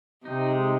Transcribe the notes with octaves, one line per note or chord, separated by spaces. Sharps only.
C3 D#4
G#3